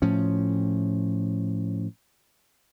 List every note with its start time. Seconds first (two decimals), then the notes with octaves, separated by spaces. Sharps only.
0.02 A2 F3 C#4